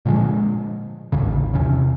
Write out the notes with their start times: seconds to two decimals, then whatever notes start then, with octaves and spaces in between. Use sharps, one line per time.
0.05 A#2 D3 F3 G#3
1.12 A1 D#2 C#3
1.54 E2 C3 C#4